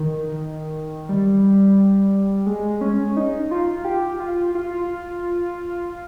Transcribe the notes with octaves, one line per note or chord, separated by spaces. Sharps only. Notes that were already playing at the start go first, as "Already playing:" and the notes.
Already playing: D#3
G3
G#3
C#4
D#4
F4
G4
F4
F4